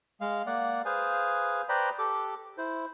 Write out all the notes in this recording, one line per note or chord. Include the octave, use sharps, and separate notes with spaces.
G#3 F5
A#3 D5 F#5
G#4 B4 C5 F5 G#5
B4 C5 D5 G5 A#5 B5
G4 A4 D6
E4 C5